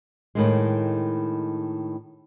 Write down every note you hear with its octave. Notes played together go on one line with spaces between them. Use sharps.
A2 D#3 G#3